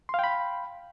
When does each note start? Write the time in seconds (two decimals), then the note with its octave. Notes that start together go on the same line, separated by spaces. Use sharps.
0.09 C6
0.14 F5
0.19 G5
0.24 B5